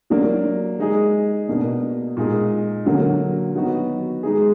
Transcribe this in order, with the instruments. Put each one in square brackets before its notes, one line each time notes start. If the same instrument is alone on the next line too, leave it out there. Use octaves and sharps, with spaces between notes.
[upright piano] F#3 A#3 D4
G#3 D#4 G#4
B2 A#3 D4
A#2 G#3 D#4 G#4
D3 F#3 A#3
D#3 F#3 B3 D#4 F#4
G#3 D#4 G#4